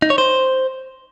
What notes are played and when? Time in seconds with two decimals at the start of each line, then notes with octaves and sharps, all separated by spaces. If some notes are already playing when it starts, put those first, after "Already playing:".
0.02 D#4
0.10 C#5
0.18 C5